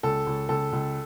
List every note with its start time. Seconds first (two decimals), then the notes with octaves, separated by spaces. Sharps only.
0.03 C#2 A4
0.26 C#2
0.49 C#2 A4
0.72 C#2